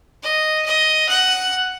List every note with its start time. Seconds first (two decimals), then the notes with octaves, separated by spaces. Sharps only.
0.22 D#5
0.66 D#5
1.08 F#5